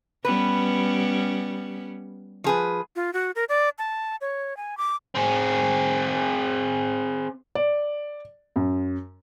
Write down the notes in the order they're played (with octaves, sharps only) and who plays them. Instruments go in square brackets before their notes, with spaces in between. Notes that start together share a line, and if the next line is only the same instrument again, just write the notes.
[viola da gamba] G3 B3 C#4 [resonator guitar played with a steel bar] B4
[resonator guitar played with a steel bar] F3 G#4 B4
[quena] F4
F#4
A#4
D5
A5
C#5
G#5
D6
[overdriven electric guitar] C4 G#4
[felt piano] D5
F#2